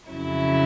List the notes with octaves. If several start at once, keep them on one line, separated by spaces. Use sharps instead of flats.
F2 C#3 F#3 E4